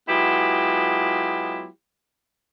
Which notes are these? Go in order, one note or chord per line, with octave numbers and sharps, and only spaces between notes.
F#3 G#3 B3 E4 F4 G4